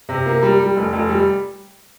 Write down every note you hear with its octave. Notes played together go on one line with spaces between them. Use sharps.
C3
A#3
G3
G3
F1
F1
G3